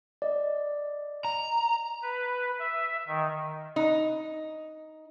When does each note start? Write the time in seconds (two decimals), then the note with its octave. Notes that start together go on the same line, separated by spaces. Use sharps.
0.22 D5 D#5
1.25 A#5
2.03 B4
2.59 E5
3.08 D#3
3.76 D#4